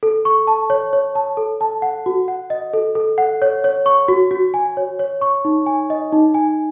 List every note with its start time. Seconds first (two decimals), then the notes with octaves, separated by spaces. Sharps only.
0.03 A4
0.25 C#6
0.47 A5
0.70 C#5
0.93 C#5
1.15 A5
1.37 A4
1.61 A5
1.82 F#5
2.06 F#4
2.28 F#5
2.50 D#5
2.73 A4
2.95 A4
3.18 F#5
3.42 C#5
3.64 C#5
3.86 C#6
4.08 F#4
4.31 F#4
4.54 G#5
4.77 C#5
4.99 C#5
5.21 C#6
5.45 D#4
5.66 G#5
5.90 D#5
6.12 D#4
6.34 G#5